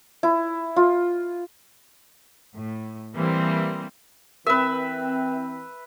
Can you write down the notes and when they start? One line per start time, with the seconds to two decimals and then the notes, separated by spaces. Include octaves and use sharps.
0.23 E4
0.76 F4
2.53 A2
3.14 E3 G3 A#3 C4
4.46 E3 C4 A#4 B4 E5